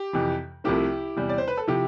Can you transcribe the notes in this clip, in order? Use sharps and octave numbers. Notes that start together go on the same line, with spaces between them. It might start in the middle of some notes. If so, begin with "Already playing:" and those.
Already playing: G4
F2 C3 E3
C2 C3 F3 A3 E4 G4
E2 C3 G3
D5
C5
B4
A4
C3 F3 E4 G4